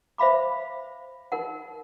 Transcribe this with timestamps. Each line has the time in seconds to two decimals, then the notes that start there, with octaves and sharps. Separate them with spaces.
0.18 C5 E5 F5 B5 D6
1.32 D#4 A#4 F#5